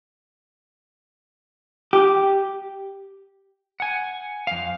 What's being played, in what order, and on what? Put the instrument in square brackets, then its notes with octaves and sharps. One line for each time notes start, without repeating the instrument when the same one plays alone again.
[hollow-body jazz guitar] G4
[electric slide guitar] F#5 G#5
F2 F5